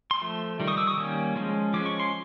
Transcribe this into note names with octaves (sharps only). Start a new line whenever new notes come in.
C6
F3 A3
D#3 G3
C#6 D#6
D6 E6
C#6 D#6
D#3 G3 A#3 C#4
F3 G#3 C#4
F3 G#3 C#4 D6
C#6
C6